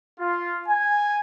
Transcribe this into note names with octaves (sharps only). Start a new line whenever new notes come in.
F4
G#5